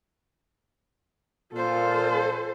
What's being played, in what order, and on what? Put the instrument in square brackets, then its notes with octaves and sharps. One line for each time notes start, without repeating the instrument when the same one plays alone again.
[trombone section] A#2 F4 [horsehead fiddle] A4 C5